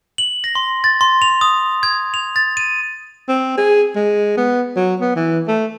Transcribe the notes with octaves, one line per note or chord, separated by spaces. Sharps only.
F#7
A#6
C6
A6
C6
F7
D#6
G#6
F7
A6
D#7
C4
G#4
G#3
B3
F#3
B3
E3
A3